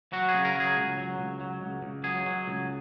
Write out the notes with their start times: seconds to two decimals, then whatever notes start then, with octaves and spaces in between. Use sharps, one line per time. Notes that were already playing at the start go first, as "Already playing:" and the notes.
0.13 F#3 F#4
0.29 G#4
0.34 C#3
0.45 A#4
0.55 F#3
0.60 G#4
0.77 C#2
0.98 F#3
1.19 C#2
1.41 F#3
1.61 C#2
1.83 C#2
2.04 F#3 G#4
2.26 F#3
2.48 C#2